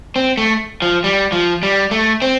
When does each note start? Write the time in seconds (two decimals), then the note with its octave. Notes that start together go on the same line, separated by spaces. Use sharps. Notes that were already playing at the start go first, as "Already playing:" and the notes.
0.16 C4
0.37 A3
0.82 F3
1.04 G3
1.32 F3
1.63 G3
1.91 A3
2.22 C4